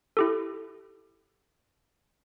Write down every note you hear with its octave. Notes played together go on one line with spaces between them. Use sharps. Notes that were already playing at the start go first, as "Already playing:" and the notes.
E4 G4 A4